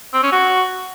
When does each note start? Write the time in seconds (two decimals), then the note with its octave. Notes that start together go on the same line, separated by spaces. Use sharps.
0.14 C4
0.23 C#4
0.32 F#4